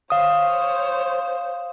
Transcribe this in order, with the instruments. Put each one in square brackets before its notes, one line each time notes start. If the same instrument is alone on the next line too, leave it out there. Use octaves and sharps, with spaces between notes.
[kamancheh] C5 C#5 [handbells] F5 D#6